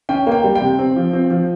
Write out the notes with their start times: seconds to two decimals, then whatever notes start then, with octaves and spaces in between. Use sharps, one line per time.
0.09 C#4 G5
0.27 A#3 G5
0.44 G3
0.55 G5
0.61 C3
0.79 C4
0.96 F3
1.13 C4
1.30 F3